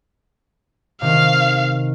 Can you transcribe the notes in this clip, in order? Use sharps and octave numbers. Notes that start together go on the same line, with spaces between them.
C3 D#3 F5